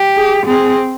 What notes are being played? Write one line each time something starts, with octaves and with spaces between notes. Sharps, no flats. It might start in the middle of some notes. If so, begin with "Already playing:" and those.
Already playing: G4
G#4
C4 G#4